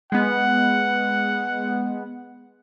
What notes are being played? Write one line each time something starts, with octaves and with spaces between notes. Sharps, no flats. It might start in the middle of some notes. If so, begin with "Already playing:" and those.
G#3 B3 F#5